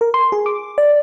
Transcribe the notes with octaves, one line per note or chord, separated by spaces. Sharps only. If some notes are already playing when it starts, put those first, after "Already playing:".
A#4
C6
G#4
D6
D5